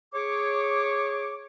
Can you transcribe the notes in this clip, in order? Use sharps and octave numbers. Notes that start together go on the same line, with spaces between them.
G#4 C#5 D6